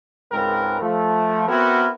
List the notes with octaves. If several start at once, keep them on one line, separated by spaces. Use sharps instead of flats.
C#2 G#2 G#3 C4 A#4 B4
F3 A3
B3 C4 E4 F#4 A#4